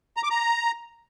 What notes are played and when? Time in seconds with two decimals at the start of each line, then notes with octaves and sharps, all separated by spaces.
0.17 A#5
0.24 D6
0.30 A#5